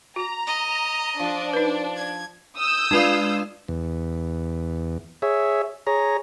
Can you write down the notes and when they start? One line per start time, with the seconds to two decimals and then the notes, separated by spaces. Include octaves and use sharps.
0.16 F#4 A#5
0.47 D#5
1.19 F3 D4
1.53 D#4 B4
1.96 G#6
2.57 D#6 E6 G6
2.91 G#3 D4 F4 B4 D5 F5
3.68 E2
5.22 G#4 C#5 E5
5.87 G#4 C#5 A#5